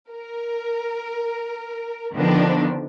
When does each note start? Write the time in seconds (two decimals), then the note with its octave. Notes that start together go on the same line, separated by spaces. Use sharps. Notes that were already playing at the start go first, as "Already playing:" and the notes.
0.11 A#4
2.16 D3 D#3 F3 B3 C4 D4